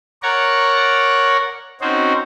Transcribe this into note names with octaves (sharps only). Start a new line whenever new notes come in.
A#4 C#5 D5 F#5 A#5 C#6
C4 C#4 D#4 F#4 C5